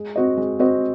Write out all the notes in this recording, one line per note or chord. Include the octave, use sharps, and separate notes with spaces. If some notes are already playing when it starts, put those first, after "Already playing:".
Already playing: G#3
C4 F#4 C5 D#5
G#3
C4 F#4 C5 D#5